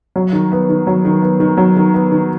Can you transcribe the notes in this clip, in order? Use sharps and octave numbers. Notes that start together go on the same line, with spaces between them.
F#3
D#3
B3
D#3
F#3
D#3
B3
D#3
F#3
D#3
B3
D#3